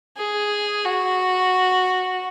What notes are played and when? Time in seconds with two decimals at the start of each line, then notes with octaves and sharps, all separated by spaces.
0.17 G#4
0.85 F#4